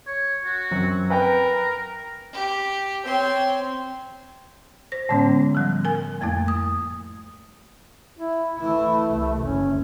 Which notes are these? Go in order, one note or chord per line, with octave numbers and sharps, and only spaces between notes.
C#5
F#4
F#2 F#3 C4
A#4 B4 G5
G4
C4 C#5 C6
C5 A#6
A2 D3 G#3 B3 C#4
F3 G3
A#4 G#5
F2 A3 A#3 E4
D#6
E4
E3 A3 E4
C2
F#1 D2 C#4